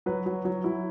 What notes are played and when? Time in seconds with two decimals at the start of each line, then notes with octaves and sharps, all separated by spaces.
0.06 F#3 B4
0.26 F#3
0.45 F#3
0.64 F#3 E4